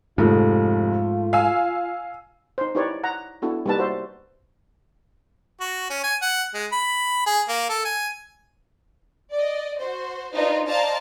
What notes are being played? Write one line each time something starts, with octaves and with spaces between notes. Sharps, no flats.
F1 G#2 F3 A3 F4
F5 G#5 E6
D#4 C5
D#4 E4 G4 B4 C#5 D5
F#5 A#5
B3 D4 E4 F#4 A4
G3 A#3 D#4 B4 A5
F#4 C5 E5
F#4
C#4
G#5
F#5
G#3
B5
G#4
A#3
A4
G#5
D5 D#5
F#4 C5
D4 D#4 F4 B4 C5
C5 D5 D#5 F5 A5 A#5